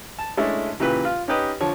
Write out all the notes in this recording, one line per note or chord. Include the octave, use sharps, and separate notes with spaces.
A5
G#3 A3 C#4 D4 E4
A#2 C#3 E3 G4 B4
F4
C#4 D#4 G4 B4 D#5
D3 F3 C#5